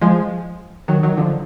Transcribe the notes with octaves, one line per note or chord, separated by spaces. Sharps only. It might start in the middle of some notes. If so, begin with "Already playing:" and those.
F3 G#3
D#3 F#3
D#3 F#3
D3 F3